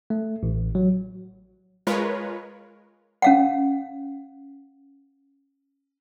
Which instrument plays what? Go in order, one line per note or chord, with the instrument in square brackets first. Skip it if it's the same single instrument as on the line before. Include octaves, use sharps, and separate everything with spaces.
[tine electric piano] A3
A1
F#3
[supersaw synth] G#3 F4 A#4 B4 C#5
[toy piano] C#4 F5 F#5